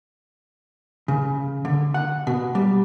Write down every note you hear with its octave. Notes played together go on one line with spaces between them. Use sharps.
C#3
D3
F#5
B2
G3